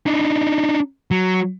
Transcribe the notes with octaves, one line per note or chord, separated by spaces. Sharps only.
D4 D#4
F#3